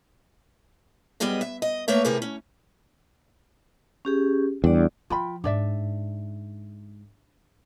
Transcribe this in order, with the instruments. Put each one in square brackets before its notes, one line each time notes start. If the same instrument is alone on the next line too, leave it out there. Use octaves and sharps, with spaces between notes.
[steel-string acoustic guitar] F#2 G3 B3 G#4 B4 D#5
E5
D#5
A3 A#3 B4 C#5 E5
A2 C3 G#4 A#4 B4
C#4
[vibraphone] C#4 G4 G#4
[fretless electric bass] E2 [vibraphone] G3 D4 D5
[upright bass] F3 [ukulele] F4 G5 B5
[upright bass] G#2 [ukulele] D4 D5 E5